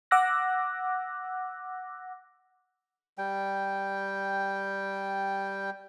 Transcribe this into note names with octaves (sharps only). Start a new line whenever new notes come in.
F#5 D6 E6 F#6 A#6
G3 G5